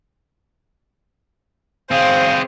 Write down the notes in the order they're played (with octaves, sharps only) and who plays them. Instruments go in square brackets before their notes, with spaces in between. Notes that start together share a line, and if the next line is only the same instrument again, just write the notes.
[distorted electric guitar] C4 G#4 [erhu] C5 [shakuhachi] F5